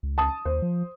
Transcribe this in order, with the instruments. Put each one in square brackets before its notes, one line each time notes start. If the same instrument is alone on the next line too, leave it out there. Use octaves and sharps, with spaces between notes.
[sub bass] C#2
[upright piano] A5 D#6
[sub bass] D#2 [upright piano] C5
[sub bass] F3